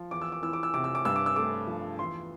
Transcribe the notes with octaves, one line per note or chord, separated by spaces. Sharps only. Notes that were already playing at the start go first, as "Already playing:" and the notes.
Already playing: F3
E2 D6
E6
D6
E3 E6
D6
E6
C3 D6
E6
D6
G2 E6
D6
E6
A3 D6
F3
E2 C6